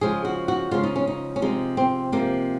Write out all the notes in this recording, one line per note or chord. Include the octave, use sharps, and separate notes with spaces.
C#3 F3 G#3 G#4
F#4
F#4
C#3 F3 G#3 F4
D#4
C#4
D#4
C#4
C3 F3 G#3 D#4
C4
C3 F3 G#3 A#3